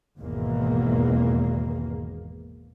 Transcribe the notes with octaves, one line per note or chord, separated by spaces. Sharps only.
G#1 E2 B2 A#3